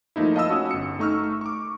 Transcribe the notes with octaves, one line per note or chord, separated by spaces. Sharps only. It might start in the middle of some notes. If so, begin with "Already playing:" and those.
F3 A3 A#3 D#4 E4
D#5 F5 A5 B5 D#6 E6
C#4 F#4
G1 C#7
A3 D#4 C#6 E6 F6
C#6 D6